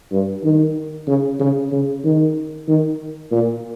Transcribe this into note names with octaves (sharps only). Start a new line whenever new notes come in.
G2
D#3
C#3
C#3
C#3
D#3
D#3
A#2